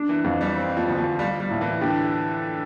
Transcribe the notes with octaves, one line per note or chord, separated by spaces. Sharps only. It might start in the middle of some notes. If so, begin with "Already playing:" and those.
Already playing: D4
E3
F2
G3
C4
F3
D2
F3
G3 F4
G3
A2
E3
D3 G4